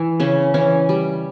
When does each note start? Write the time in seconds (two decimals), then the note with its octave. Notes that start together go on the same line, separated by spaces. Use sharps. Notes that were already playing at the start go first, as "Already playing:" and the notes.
Already playing: E3 E4
0.20 C#3 C#4
0.54 E3 C#4
0.89 G3